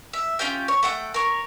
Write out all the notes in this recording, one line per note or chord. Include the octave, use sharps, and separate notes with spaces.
E5
C#4 F4 G4 G5
C#5
A3 F#5 G5
A#4 C#5